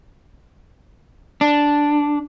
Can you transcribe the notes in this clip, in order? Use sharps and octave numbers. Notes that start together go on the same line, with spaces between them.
D4